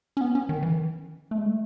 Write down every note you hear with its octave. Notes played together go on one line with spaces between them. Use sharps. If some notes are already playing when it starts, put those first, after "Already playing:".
C#4
B3
C#4
D#3
E3
A3
G#3
A3